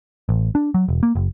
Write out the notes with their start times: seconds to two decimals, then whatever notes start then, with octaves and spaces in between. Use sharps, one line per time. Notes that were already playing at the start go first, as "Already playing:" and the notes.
0.29 A1
0.55 D4
0.74 F#3
0.88 E1
1.03 A#3
1.15 F#1